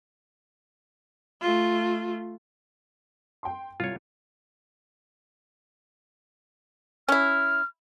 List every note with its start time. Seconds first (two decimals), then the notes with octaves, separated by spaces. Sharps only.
1.42 A3 F4
3.43 G5 C6
3.80 C2 F4 C#5
7.09 C#4 E4 F6